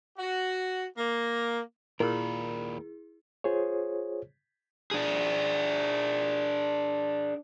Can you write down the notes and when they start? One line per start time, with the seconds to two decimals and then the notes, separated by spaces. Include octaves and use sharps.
0.18 F#4
0.97 A#3
2.00 D#2 A#2 E4 G#4 A#4 B5
3.44 F4 G#4 C5 C#5
4.91 D4 G#4